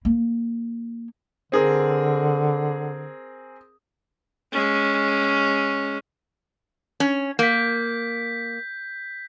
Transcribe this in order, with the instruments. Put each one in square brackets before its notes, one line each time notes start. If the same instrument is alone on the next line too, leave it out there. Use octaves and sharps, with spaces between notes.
[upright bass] A#3 F4
[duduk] D3 [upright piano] C4 G#4 A#4
[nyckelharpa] G#3 C#4
[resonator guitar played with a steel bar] C#4
[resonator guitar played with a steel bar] A#3 [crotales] G6 B6